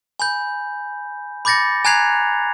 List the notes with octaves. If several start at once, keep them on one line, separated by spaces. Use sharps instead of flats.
G#5 B5 G6
B5 D6 G6 A6 A#6 C#7
G#5 A#5 F#6 G#6 C7 F7